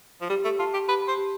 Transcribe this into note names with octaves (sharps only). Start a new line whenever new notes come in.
F3
G3 G4
A3
F4 A5
G4
G4 B4
C5
G4